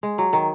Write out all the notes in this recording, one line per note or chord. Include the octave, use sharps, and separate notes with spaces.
G#3
F#3
D#3